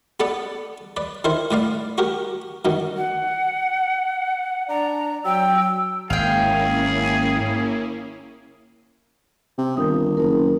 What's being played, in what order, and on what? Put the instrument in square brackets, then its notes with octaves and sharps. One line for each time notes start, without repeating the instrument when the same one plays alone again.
[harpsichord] B3 A4 B4 D5 F#5
B4 D5
D#3 E4 A#4 C5
A2 B4 D5 F5
F#4 G4 A#4
F#2 D#3 F#3
[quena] F#5
[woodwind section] D4 D5 [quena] A#5
[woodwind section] F#3 E6 [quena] G5
[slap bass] G#1 [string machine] A#3 C#4 E4 [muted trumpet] G#4 [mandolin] F5 G5
[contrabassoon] C3
[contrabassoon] G1 [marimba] D#3 A#4 D#6
[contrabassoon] F#1 [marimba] A#4